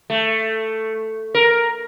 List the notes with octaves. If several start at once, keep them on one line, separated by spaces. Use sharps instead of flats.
A3
A#4